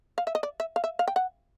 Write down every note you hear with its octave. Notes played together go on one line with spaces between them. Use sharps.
F5
E5
D#5
D5
E5
F5
E5
F5
G5
F#5